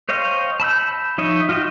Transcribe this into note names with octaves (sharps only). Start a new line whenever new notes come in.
C5 C#5 D#5 F5 G5
A5 B5 E6 G6
F3 D#4 C#5 D#5 E5
F4 F#4 D#5 E5 G5